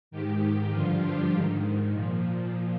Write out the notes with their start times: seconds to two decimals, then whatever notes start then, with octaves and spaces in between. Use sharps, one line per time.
0.11 G#2 D#3 G4
0.71 G2 D3 F3 F4
1.01 G4
1.32 G#2 D#3
1.91 A#2 F3